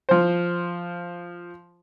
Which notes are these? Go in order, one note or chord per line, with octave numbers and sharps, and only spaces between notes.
F3 C5